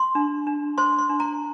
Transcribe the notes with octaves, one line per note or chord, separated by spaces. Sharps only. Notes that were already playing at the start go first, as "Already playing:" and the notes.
Already playing: C6
D4
D4
C5 C6
C6
D4
A#5